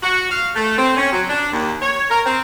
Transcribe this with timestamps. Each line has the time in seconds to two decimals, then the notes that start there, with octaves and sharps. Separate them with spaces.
0.02 F#4
0.31 F5
0.55 A3
0.78 C4
0.97 C#4
1.12 F#3
1.28 D4
1.52 D#2
1.81 C#5
2.10 A#4
2.25 C4